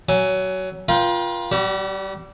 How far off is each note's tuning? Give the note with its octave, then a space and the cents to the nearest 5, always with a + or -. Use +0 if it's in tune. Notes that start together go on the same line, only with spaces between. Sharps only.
F#3 +20 G#5 +0
F4 +0 A#4 +45 G5 +0
G3 -20 F#4 +35